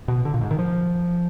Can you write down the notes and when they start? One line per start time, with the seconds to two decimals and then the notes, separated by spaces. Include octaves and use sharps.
0.08 B2
0.25 D3
0.34 A#2
0.41 G#2
0.51 D#3
0.59 F3